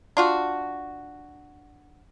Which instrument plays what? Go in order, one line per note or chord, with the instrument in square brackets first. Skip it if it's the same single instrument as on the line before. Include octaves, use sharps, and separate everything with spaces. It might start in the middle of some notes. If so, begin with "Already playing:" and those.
[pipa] D4 F4 F#4